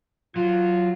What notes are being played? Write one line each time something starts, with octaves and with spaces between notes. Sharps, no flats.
F#3 F4